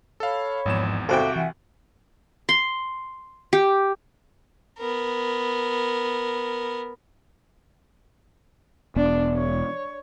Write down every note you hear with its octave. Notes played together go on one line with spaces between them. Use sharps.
A4 C#5 F5 B5
G#1 E2 G#2 F3 E7
C2 F#4 A4 C5 E5 F5 G5 D6
E3 E5 F#5 G#5
C6
G4
B3 A#4
E1 B3 D4
C#5